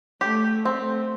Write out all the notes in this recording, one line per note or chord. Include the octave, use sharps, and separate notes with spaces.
A3 G4
C4
A3